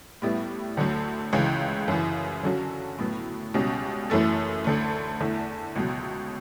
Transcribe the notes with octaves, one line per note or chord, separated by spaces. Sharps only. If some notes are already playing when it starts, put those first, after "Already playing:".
A2 G3 B3 E4
D2 D3 F#3 A3
C#2 C#3 E3
F#2 C#3 E3
D3 F#3 C#4 F#4
A2 F#3 B3
C#2 B2 G3 C#4
F#2 E3 A3 E4 A4
D2 D3 A3
E2 D3 A3 E4
C#2 B2 F#3